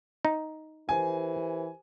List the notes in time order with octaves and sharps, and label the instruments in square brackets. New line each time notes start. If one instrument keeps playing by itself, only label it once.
[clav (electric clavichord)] D#4
[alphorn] E3 [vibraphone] G4 A#4 C5 [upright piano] G#5